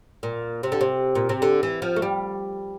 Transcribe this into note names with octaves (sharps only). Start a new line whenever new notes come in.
A#2
C3
D3
C3
A#2
C3
D3
E3
F3
A3
G3